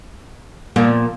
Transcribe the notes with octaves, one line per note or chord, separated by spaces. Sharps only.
A#2 F3 A#3